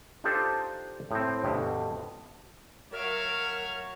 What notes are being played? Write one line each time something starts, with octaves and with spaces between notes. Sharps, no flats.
D4 D#4 F4 G4 A4 C5
A2 C4
D2 G2 B2
F#3 A#4 C#5 E5 F5